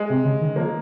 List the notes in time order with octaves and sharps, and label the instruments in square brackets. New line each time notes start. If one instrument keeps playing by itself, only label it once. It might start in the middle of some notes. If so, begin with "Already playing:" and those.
Already playing: [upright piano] G#3
[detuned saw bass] C3
C#3
D#3
[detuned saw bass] F3 [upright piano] A#3